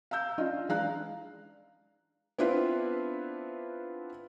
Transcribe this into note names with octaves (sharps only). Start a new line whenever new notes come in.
F5 A#5 E6 G6
C#4 D4 F4 D#5 F5
E3 G#3 D4 F5 A#5 F#6
B3 C4 D4 E4 F4 B4